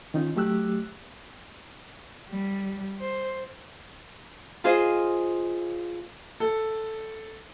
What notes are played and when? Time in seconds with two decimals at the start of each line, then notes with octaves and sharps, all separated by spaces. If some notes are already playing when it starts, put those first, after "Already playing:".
0.14 D#3 C#4 D#4 F4
0.36 F#3 A3 G4 E6 F#6
2.29 G3
3.01 C5
4.64 F4 G#4 C5 D#5
6.40 A4